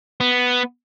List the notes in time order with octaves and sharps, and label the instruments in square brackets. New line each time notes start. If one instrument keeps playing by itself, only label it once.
[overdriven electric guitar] B3